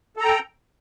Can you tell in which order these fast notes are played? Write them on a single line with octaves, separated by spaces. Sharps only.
A4 A#5 G5